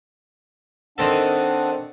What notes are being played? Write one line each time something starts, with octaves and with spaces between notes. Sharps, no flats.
D#3 C4 D4 A4 F#5